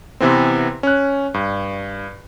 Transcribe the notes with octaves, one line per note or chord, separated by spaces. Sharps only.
C3 E3 B3 C4
C#4 F#6
G2